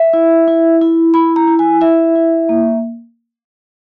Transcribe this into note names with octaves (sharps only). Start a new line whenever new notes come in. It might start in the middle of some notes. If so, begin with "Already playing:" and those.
Already playing: E5
E4
E4
E4
E4 B5
A#5
E4
G#5
E4 E5
E4
A#3